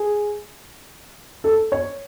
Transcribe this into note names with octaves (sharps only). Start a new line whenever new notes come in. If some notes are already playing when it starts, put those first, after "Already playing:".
Already playing: G#4
A4
C#5